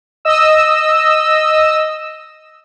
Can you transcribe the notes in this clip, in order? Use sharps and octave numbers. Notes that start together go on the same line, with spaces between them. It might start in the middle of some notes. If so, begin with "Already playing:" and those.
D#5 E6